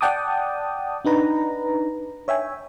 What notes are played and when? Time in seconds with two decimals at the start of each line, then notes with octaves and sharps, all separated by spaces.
0.01 D5 F#5 G5 A5 D6 D#6
1.05 D4 D#4 B4 A#5
2.28 C#5 E5 G5 G#5